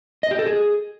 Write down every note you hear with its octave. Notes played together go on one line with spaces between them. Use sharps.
D#5
G4
A4
G#4